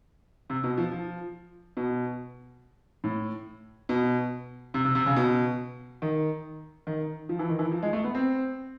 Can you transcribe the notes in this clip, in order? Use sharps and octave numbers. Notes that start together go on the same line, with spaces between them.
C3
B2
F3
F3
B2
A2
B2
C3
C3
C3
C#3
B2
D#3
D#3
F3
E3
D#3
E3
F3
G#3
A3
B3
C4